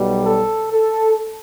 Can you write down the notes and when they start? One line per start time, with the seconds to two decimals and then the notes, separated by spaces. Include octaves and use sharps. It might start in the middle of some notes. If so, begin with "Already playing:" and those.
Already playing: B1 B2 G3
0.25 A4
0.72 A4